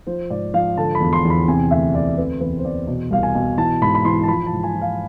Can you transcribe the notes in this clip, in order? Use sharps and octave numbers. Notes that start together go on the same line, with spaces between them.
F3 C5
G#2 D5
F3 F5
D3 A5
B5
E2
C6
E2
B5
C3 G#5
D2 E5
D2 D5
C3 B4
E2 B4
C5
E2 D5
B2
C2 F5
G#5
B2
E3 A5
G#2 B5
B5
E3 C6
A5
F3 B5
A5
G#2
G#5
F3
F5